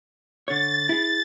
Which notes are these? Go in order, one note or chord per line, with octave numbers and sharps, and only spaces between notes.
D3 C#5 A6
E4 G#4